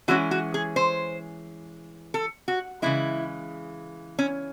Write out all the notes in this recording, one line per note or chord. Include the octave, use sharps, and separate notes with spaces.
E3 G#3 C#4 F#4
F#4
G#4
C5
A4
F#4
C#3 E3 G#3 E4
C#4